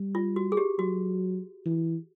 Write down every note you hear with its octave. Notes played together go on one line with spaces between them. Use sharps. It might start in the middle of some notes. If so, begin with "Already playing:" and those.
Already playing: G3
F4
F#4
G#4
G4
F#3 F#4
E3